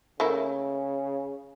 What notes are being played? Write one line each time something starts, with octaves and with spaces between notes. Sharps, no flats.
C#3 A3 A#3 E4